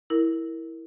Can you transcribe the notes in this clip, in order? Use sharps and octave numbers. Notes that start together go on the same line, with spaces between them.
E4 A#4